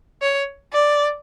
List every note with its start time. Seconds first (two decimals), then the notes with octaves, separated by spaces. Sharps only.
0.22 C#5
0.73 D5